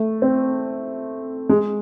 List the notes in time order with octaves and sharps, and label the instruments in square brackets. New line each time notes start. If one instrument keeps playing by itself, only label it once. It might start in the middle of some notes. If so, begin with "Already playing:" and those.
Already playing: [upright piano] A3
C4
G#3